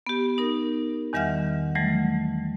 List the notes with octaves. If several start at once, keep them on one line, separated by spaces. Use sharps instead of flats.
B3 G4
D#4 A#4
E2 D#3 G3 E5 F#5 F6
E3 F#3 G3 A3